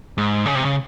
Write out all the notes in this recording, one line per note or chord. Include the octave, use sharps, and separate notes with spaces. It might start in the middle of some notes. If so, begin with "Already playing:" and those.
G#2
C#3
C3
C#3